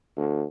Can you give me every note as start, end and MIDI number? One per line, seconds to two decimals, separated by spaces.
0.17 0.44 38